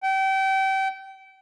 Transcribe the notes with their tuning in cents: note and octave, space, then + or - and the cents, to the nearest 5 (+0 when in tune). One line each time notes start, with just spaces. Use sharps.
G5 -30